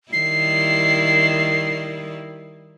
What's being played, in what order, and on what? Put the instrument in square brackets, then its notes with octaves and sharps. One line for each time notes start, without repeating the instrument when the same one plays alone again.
[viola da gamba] D#3 G3 E4 [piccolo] C7